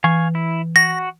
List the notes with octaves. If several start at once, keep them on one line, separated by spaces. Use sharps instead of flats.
E3 F5 G#5 C#6
E4
F#4 A#6